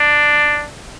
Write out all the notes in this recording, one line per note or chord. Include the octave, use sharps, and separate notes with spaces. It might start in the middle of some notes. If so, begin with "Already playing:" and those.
Already playing: D4